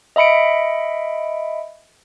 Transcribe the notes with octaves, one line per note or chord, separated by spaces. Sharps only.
D#5 E5 B5 C#7 D7